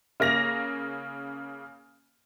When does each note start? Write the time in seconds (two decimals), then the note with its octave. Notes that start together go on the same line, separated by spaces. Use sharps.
0.20 C#3 A#3 A#6 F7